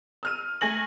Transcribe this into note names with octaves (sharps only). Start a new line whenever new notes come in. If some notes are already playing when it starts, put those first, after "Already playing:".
E6 F6 D#7
A3 G#5 A#6 F#7